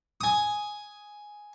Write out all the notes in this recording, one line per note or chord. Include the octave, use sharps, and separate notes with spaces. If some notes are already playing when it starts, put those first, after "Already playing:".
G#5 D#6